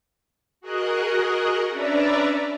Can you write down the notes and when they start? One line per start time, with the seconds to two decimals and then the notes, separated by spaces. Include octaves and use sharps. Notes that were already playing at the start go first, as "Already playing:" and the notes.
0.61 F#4 G#4 A#4 D#5 F#5
1.71 C#4 D4 B4 D5 E5 A#5